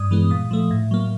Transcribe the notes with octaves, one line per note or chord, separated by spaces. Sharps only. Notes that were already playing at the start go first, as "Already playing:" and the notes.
Already playing: G2 D#6
E3 G#3 B3
A#2 D#6
F3 A3
A2
F#3 A#3